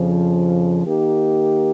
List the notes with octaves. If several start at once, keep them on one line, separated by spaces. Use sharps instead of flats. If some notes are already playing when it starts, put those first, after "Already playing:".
Already playing: F2 C#3 F3
D#3 A#3 D#4 G4